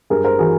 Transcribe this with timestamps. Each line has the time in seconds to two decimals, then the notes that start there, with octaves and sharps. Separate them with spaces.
0.10 G2 G#4 A#4
0.25 A#4 C5
0.39 E3 F#4 G#4